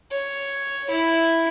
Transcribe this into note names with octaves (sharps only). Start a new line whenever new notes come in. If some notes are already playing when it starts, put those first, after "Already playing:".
C#5
E4